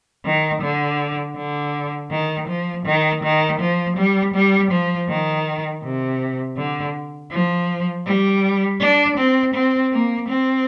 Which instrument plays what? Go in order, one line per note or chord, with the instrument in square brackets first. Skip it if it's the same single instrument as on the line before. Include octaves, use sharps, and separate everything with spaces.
[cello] D#3
D3
D3
D#3
F3
D#3
D#3
F3
G3
G3
F3
D#3
C3
D3
F3
G3
D4
C4
C4
A#3
C4